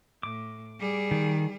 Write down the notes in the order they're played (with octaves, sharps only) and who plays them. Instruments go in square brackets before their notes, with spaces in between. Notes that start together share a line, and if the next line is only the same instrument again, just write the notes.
[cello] A2 [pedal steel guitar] D6
[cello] G3 G#4
[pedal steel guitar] D#3